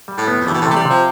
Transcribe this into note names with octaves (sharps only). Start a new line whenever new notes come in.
G3
A2
B3
F2
G2 E3
B2
A2 C3
A3
G3
C3 F3